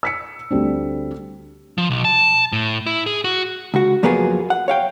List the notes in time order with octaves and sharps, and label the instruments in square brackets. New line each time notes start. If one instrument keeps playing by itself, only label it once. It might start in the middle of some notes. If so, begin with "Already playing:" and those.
[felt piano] E6 B6 C#7
D2 G3 C4 D4
[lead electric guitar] F3
B1
A5
A2
E4
G#4
F#4
[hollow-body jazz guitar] C#2 F#4
F2 F#3 A#3 B3 F4 G#4
F#5
C#5 F5 G5